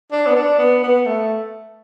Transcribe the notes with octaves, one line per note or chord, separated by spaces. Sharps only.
D4
B3
D4
B3
B3
A3